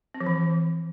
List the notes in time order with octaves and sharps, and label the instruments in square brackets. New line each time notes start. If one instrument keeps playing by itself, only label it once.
[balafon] C4
F3
E3